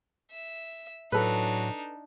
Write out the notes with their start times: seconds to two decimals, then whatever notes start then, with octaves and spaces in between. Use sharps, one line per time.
0.31 E5
1.12 A2 F#3 D4 D#4 A4 B4